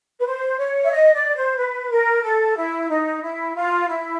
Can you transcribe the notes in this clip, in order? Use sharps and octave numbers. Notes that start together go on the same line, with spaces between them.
B4
C5
C#5
E5
D#5
D5
C5
B4
A#4
A4
E4
D#4
E4
F4
E4